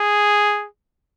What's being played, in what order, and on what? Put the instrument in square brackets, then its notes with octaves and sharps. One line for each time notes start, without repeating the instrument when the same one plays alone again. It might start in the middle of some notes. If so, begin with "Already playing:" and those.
Already playing: [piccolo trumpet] G#4